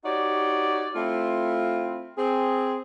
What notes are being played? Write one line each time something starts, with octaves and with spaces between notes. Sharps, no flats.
D#4 F#4 G4 C#5 D5
A3 C4 E4 F4
C4 G#4